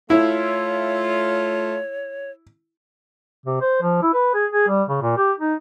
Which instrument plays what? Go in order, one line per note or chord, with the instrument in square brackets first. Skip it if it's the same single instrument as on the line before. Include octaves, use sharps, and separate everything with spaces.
[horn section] A3 F4 [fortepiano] E4 [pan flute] C#5
[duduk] C3
C5
F3
E4
B4
G#4
G#4
G3
C#3
A#2
G4
D#4